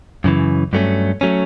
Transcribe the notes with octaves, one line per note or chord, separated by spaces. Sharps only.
F#2 C#3 E3
G2 F#3 A3 C#4
F#3 A3 C#4